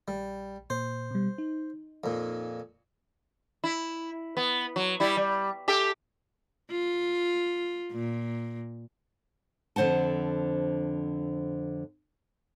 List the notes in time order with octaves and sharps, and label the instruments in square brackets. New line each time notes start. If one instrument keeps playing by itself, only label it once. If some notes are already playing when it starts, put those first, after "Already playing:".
[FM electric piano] A#1 [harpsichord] G3
[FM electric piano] A#2 [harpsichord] C5
[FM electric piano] B2 G3
D#4
[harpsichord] F2 A#2
[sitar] E4
B3
F#3
G3 E4
G3
G4 A4 E5
[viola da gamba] F4
A#2
[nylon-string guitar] F2 D3 C5 F#5 A5